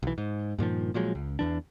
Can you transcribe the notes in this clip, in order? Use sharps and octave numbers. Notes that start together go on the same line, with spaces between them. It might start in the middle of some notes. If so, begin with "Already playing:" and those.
B1 E3
G#2
G2 A#2 D#3 F3
A#2 F3 F#3 G#3
C#2
E2 E3 D4